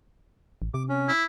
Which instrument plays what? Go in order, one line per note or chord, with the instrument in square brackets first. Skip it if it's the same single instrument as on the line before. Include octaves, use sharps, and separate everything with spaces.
[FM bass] A1
[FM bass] C3 [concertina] D6
[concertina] C#4
[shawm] E4